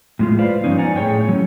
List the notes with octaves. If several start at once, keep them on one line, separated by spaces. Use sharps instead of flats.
A2 G#3 F4
F4 B4 C5 D5 F5
G2 C3 F3 B3 C#4 D#4
D5 F#5 G#5 A#5
A2 G#4 C#5 G5
F#3 C#4